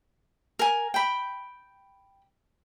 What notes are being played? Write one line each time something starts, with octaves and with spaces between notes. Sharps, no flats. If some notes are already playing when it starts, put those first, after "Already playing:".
A#4 G#5
G5 B5